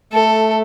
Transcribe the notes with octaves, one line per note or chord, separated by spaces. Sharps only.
A3 A4